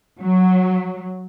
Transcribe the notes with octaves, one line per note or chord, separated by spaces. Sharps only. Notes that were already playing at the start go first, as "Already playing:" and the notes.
F#3